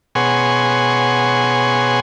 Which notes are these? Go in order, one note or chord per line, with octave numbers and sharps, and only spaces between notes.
B2 G#4 C#5 F#5 G#5 C6